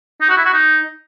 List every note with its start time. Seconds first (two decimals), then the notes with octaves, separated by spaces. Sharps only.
0.21 D#4
0.29 F#4
0.37 E4
0.45 F#4
0.54 D#4